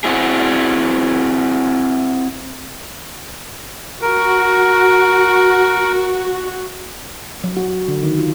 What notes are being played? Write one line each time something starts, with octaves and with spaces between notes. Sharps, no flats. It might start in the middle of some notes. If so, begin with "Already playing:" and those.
C4 E4 F#4 G#4
F#4 A#4
F#3
F#4
D3
D#3
F4